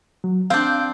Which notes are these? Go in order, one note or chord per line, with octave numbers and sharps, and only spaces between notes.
F#3
C4 D4 F5 G6